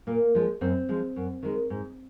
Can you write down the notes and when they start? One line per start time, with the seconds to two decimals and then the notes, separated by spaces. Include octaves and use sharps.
0.07 A#2 A#3
0.35 F3 G#3
0.61 F#2 C4
0.89 F3 G#3
1.16 F#2
1.43 D#3 G#3
1.70 G#2